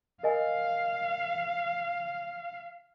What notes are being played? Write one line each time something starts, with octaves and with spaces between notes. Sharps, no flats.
A#4 D#5 F5 G#5